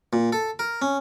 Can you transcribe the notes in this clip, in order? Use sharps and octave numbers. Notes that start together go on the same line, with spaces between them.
A#2
A4
A#4
C#4